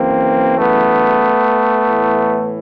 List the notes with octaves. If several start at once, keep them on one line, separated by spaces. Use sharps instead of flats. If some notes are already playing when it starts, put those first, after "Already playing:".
Already playing: F#2 C#3 E3 A#3 C4
A3 B3
A2 E3